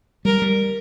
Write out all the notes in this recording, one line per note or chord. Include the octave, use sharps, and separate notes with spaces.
G3 A#4
G3